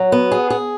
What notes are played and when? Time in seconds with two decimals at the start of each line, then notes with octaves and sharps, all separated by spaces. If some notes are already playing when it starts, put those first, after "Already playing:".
Already playing: F#3
0.12 B3
0.32 G#4
0.50 G#4